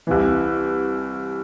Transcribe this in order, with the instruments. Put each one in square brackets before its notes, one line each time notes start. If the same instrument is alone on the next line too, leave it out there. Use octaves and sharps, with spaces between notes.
[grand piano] C2 C3 E3